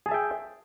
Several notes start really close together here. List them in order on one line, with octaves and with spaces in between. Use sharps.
G#4 A5 E5 G5